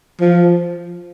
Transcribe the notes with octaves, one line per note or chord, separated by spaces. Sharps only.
F3